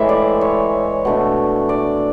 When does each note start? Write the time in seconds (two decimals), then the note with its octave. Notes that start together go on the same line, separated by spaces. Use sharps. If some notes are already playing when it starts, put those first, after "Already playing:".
Already playing: A2 E3 G#3 E5
0.09 D5
0.41 C#5
1.05 B2 A3 D4
1.69 D5